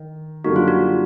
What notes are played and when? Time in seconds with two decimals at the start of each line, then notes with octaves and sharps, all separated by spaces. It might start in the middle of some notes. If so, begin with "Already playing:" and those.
Already playing: D#3
0.44 F#2 D3 G3 A#3 D#4 F#4
0.56 F4
0.68 F#4